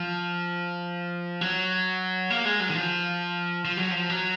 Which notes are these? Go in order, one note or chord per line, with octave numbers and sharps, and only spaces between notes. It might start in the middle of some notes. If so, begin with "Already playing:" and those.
Already playing: F3
F#3
A#3
G#3
F#3
D#3
F3
F3
F#3
F3
F#3